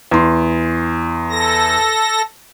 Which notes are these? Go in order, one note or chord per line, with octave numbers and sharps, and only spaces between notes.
E2 C6
A4 A#6